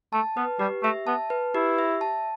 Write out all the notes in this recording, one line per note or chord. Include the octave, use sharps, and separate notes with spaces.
A3 A5
B3 B4
G3 G4
A3 E5
B3 A5
B4
E4 G4
E5
A5